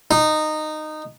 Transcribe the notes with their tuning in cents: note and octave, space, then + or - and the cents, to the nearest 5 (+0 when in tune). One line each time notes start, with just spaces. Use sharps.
D#4 -15